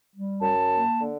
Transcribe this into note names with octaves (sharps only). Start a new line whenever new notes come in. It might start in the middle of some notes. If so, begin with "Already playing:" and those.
G3
F#2 A5
A#3
D3